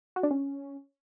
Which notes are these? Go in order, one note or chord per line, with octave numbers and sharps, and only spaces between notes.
F#4
D4
C#4